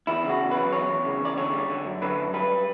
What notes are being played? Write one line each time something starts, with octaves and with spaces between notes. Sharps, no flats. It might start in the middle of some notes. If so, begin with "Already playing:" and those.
E2 E4
C#3
F#4
E2
B4
F#3
E2 C#5
E2
C#3
E2 D5
D3 C#5
G3
D3
F#2
D3 B4
F#2
G3 B4
G3